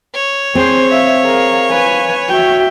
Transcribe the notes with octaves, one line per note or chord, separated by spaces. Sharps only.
C#5
C4 G#4 C5
E5 F5
G#4 A#4
B4 G#5
F#4 E5 G5